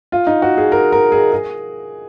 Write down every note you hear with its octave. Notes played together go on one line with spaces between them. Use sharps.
F4
D#4
F#4
G#4
A#4
A#4
G#4
G#4